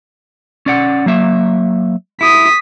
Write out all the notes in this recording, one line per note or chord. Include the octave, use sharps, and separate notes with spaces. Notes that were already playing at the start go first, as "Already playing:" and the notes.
C#4 D5 F#5
F#3 A#3 E5
E4 D#6 B6